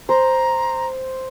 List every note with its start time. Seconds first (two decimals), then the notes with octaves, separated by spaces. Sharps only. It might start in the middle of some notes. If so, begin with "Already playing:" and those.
0.09 C5 A#5